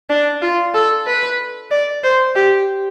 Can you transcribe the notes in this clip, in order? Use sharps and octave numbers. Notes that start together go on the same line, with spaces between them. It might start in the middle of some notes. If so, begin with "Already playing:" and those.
D4
F4
A4
B4
D5
C5
G4